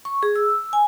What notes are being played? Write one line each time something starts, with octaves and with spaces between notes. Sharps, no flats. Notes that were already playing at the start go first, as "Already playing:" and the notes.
C#6
G#4
E6
G#5